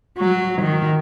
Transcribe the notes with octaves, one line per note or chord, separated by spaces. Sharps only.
F#3
D#3